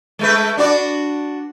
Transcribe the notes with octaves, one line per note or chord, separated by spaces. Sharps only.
G#3 A3 B4
D4 F#4 D5